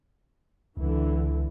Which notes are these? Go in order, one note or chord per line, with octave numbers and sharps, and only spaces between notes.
C#2 D3 E3